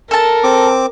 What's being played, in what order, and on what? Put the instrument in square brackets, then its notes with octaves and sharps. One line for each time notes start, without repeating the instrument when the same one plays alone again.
[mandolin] A4 A5 [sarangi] A#4
[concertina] C4 D6